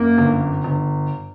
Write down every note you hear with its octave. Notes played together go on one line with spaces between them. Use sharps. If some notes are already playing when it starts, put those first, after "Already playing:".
Already playing: F#2 A#3
G1
G1